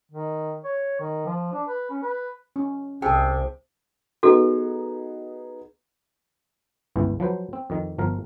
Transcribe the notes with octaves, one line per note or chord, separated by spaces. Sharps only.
D#3
C#5
D#3
F3
D4
B4
C#4
B4
C#4
C2 C3 G#4 G5 A5
B3 D#4 F#4 G#4 A4
G1 C#2 E3
F3 F#3 B4 C5
C4
F2 D#3
G1 F3 A#4